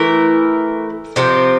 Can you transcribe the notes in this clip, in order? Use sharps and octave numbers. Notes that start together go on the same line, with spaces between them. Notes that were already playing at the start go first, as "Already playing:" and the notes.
Already playing: E3 A3 E4 A#4
C3 F3 C4 G4